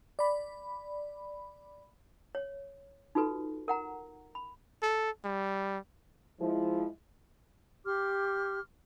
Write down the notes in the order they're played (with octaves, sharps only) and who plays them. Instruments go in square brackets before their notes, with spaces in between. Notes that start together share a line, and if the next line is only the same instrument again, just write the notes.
[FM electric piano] D5 B5
[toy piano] C#5
D#4 F4 F#4 A4 B4
A#4 F#5 A#5
B5
[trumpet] A4
G3
[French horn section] F3 G#3 E4
[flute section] G4 C6 D6 F6